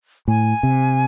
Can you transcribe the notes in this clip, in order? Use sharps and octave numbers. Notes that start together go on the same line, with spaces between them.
A2 G#5
C3